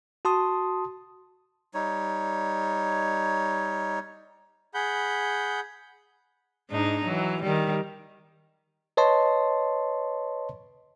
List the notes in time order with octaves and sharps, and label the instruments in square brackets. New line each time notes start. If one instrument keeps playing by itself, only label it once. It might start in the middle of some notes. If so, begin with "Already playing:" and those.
[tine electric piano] F#4 A5 C6 D#6
[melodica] G3 D#4 C#5
[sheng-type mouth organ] G#4 F#5 B5 G6
[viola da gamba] G#2 D4 D#4
E3 F#3
D#3 G3
[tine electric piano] B4 C#5 D#5 A5 C6